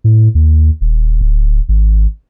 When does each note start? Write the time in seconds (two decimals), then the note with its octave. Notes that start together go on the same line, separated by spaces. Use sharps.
0.04 A2
0.35 D#2
0.81 D#1
1.21 D1
1.69 G#1